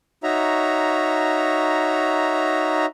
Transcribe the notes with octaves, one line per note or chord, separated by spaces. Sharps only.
D#4 F#4 C#5 E5 A#5